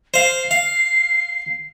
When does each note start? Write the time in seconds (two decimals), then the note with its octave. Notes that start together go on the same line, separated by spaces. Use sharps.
0.14 C5 F5 C7
0.51 F5